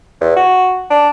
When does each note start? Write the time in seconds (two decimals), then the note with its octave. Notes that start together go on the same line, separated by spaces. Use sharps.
0.21 E2
0.36 F#4
0.90 D4